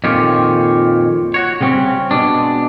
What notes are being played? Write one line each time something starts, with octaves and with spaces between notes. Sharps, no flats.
F2 A#2 D#3 F4 G4 C#5
F#4 C#5
C#3 G3 C4 C#4
B2 G#3 D4